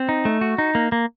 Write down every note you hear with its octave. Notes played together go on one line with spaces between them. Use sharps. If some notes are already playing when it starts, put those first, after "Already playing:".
Already playing: C4
D#4
A3
F#4
D#4
A#3
A#3